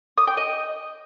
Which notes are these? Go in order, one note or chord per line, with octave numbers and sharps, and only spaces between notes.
D#6
G5
D#5